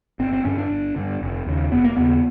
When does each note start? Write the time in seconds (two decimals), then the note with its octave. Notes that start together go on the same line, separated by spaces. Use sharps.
0.19 G1 C4
0.33 C4
0.45 G2 D3 C#4
0.58 D4
0.70 G1
0.96 G2 D3
1.21 F1
1.46 D#2 C#3
1.72 F1 B3
1.84 A#3
1.97 D#2 C#3 B3